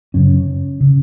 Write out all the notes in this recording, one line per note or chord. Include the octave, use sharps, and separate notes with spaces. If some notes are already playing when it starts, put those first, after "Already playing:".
F#2 C#3 C#4
C#3